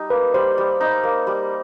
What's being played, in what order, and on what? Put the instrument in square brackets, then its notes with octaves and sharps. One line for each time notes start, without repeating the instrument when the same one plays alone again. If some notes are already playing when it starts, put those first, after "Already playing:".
Already playing: [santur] G3 D#4
[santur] A#3 [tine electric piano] B4
[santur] G3 [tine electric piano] C5
[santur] G3
D#4
A#3
G3